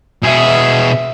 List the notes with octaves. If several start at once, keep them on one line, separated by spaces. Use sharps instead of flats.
B2 G#4 E5